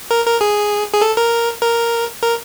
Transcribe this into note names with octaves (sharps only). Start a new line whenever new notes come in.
A#4
A#4
G#4
G#4
A4
A#4
A#4
A#4